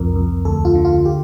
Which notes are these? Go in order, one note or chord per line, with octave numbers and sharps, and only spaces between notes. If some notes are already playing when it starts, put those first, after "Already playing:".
Already playing: C2 F2 A#4
F2
D2 A4
F4
D3
F4
G4